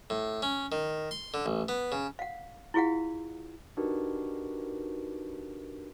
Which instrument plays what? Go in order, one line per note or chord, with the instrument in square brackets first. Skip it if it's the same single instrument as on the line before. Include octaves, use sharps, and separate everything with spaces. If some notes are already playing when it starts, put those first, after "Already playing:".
[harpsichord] A2
C#4
D#3
C6
D3
A1
B3
C#3
[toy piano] F5 F#5
E4 F4 G#4 F5 F#5
[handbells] D4 D#4 F#4 G4 A#4 B4